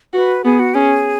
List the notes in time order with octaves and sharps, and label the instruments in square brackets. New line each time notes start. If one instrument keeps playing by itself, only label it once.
[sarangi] F#4 [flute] B4
[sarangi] B3 [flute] G#4
[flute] F#4
[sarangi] C#4 [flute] G#4